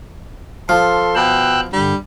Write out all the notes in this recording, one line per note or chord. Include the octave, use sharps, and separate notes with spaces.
F3 A4 C6
B2 G5 E6 F#6
G2 D3 G3